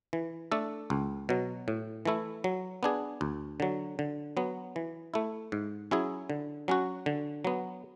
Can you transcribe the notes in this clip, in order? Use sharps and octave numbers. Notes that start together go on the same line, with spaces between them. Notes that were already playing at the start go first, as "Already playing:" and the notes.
E3
A3 D4 A4
C#2
B2 F#3
A2
E3 A3 E4
F#3
B3 D4 G#4
D2
D3 F#3
D3
F#3 B3
E3
A3 E4
G#2
F#3 C#4 E4 G#4
D3
F#3 C#4 F#4
D3
F#3 B3